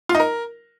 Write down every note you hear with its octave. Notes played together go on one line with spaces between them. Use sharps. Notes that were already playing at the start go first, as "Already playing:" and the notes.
F4
D#4
A#4